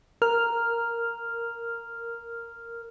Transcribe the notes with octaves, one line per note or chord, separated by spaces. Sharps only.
A#4 F6